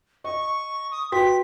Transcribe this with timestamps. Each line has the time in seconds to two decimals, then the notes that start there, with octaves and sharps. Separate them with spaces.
0.24 D#5 C#6
0.92 D#6
1.12 F#4 B4 G5 B6